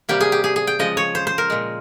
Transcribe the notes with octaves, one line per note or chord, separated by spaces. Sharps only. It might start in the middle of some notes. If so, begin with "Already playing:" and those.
C3 G3 A#3 G4
G#4
G4
G#4
G#4
G5
C#3 F3 G#3 D#5
C#5
C5
C5
A#4
A#2 G#3